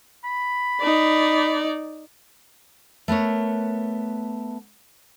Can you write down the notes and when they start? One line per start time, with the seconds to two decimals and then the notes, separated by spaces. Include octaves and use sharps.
0.24 B5
0.81 D#4 D5
3.08 A3 B3 A#4 C#5